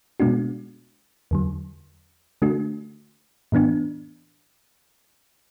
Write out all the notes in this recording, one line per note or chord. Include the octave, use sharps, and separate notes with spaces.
B2 G#3 B3 D4 F#4
E2 D3 F#3
D3 A3 D4 F#4
A2 E3 B3 D4